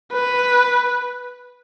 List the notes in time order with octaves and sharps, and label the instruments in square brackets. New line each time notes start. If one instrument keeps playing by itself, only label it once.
[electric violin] B4